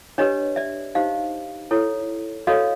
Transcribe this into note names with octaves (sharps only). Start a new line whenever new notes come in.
D4 G4 B4 C#5 D#5
D5 E5
D#4 G4 C5 D#5 F5
E4 A4 C#5
F#4 A4 C#5 D#5 F5